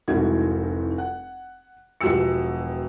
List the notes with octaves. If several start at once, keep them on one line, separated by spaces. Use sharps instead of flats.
F1 C2 G#2 E4 F#4 G#6
F#5
E1 B2 F3 G4 E6 C#7